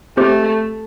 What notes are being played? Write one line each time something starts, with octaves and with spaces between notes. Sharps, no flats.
A3 C4 G4 C5